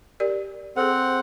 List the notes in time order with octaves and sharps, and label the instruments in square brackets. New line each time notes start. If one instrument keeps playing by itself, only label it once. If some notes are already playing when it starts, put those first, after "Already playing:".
[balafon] G4 A#4 D5
[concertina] C4 F#5 [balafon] G#4 A4